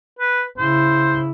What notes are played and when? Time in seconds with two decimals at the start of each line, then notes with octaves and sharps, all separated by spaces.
0.19 B4
0.58 C#3 E4 C5